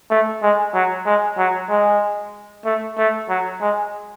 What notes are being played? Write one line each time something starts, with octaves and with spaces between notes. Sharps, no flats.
A3
G#3
F#3
G#3
F#3
G#3
A3
A3
F#3
G#3